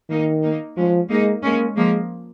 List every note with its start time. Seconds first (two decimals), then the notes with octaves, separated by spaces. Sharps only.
0.10 D#3 A#3 D#4
0.43 A#3 D#4
0.77 F3 G#3 C#4
1.10 G#3 A#3 D#4
1.43 G#3 A#3 C#4
1.77 F3 G#3 A#3